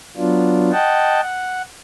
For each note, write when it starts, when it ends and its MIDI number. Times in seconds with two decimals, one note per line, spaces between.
0.17 0.71 54
0.17 0.71 59
0.17 0.71 62
0.17 0.71 65
0.72 1.21 75
0.72 1.21 78
0.72 1.21 79
0.72 1.21 81
1.21 1.62 78